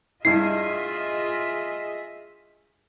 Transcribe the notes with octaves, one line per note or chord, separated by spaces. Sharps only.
G2 E4 F4 G#4 D#5 E5 C7